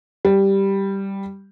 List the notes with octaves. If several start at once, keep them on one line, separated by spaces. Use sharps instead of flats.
G3